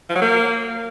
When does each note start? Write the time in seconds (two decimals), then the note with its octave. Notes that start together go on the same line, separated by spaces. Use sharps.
0.09 F3
0.16 F#3
0.22 A#3